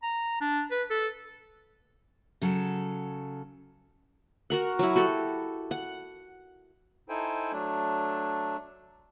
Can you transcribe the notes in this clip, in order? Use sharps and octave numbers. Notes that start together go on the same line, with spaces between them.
A#5
D4
B4
A4
C#3 F#3 A4
F#4 A#4 F#5
F#3 E4
F#4 G4 A4
F#5
D#4 E4 A4 C5 G5 G#5
F#3 A3 D4